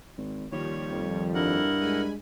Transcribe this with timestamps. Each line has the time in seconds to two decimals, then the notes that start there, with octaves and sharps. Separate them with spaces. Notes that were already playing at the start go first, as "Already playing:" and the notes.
0.18 G#1
0.52 D#2 D#3 F3 G3 C#5
0.92 F2
1.35 G2 E4 A#4 F#5
1.82 G#3 G#5 B5